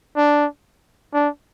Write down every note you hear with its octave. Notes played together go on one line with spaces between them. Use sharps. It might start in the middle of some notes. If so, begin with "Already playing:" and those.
D4
D4